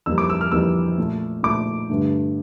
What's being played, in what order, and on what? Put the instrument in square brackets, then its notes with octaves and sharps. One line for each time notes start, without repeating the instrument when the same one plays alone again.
[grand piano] F2 E3 G3 A#3 E6
D6
E6
F6
F2 E3 G3 A#3 E6
A#2 A3
A#2 A3 D6
G2 D3 A3